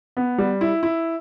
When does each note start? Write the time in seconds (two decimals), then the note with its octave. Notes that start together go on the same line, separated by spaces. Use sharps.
0.17 B3
0.38 G3
0.61 E4
0.83 E4